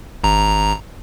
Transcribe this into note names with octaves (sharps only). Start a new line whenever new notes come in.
G#1 A#5